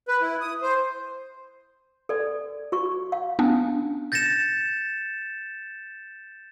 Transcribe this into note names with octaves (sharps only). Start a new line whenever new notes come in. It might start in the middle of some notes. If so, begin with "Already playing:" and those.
B4
E4
D#6
C5
A4 D5
F#4 C#6
F5
B3 C#4 D4
G6 A6 A#6 C#7 E7